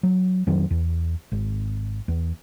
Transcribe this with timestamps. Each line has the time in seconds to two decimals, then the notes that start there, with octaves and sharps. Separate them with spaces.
0.03 F#3
0.47 F2 D#3 F#3
0.71 E2
1.32 G#1
2.08 E2